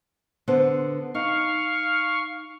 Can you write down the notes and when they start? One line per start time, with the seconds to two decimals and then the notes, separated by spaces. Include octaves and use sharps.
0.48 D3 B3 C5
1.15 D#4 F5 C#6 F6